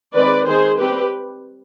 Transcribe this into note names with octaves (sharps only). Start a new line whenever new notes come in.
D#3 G#3 C4 B4 D5
D#3 G#3 C4 G#4 C5
G3 C4 G4 B4